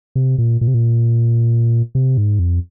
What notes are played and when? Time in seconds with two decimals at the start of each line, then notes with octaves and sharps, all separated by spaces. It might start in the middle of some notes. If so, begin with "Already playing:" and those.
0.15 C3
0.38 A#2
0.61 A#2
0.68 C3
0.74 A#2
1.95 C3
2.17 G#2
2.39 F2